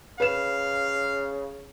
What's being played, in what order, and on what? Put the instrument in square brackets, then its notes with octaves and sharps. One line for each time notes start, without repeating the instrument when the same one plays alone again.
[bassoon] C#3 [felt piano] B4 E7 [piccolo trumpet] F5